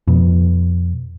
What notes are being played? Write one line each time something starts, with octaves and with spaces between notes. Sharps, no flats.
F2 B2